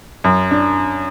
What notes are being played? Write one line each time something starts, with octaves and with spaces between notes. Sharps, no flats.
F#2
D4